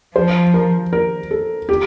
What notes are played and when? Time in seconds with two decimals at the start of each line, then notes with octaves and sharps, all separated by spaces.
0.16 F3 C5
0.54 A#4
0.93 A#4
1.31 A4
1.69 G4